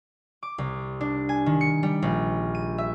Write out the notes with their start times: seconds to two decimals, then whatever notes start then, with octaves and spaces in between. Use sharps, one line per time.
0.43 D6
0.58 C2
1.01 D4
1.29 G#5
1.46 D#3
1.61 C#7
1.83 G3
2.02 A#1
2.55 D#7
2.78 E5